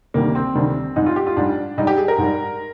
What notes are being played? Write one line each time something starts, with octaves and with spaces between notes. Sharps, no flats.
D2 C3 D#3 G3 A#3
C4
D2 C3 D#3 G3
G#2 G3 D#4
F4
G4
F4
G#2 G3 D4
G#2 G3 D#4
G4
G#4
A#4
G#2 G3